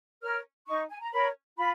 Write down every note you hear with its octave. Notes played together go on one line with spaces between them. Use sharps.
A#4 C#5 F6
D#4 C#6
G#5
A#5
A#4 C#5 B5
F4 B5